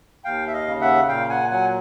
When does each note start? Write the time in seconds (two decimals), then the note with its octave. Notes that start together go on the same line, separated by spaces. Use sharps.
0.24 D#2 F5 G5
0.47 E5
0.53 D#5 F5
0.67 C#3
0.81 E5 F#5
1.08 A#2 F5 G5
1.29 F#5 G#5
1.50 F#3 F#5 G#5